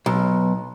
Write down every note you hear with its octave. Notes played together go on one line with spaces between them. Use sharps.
B1